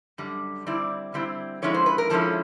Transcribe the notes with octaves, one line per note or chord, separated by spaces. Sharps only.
F#2 D3 G3
D3 G3 C4 E4 D5
D3 G3 C4 E4
D3 F3 G#3 C#4 E4 C#5
C5
B4
A#4
D3 F3 G#3 C#4 E4 A4